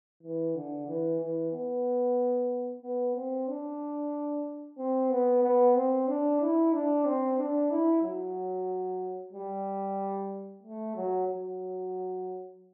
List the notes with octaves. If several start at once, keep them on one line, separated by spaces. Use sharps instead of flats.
E3
D3
E3
E3
B3
B3
C4
D4
C4
B3
B3
C4
D4
E4
D4
C4
D4
E4
F#3
G3
A3
F#3
F#3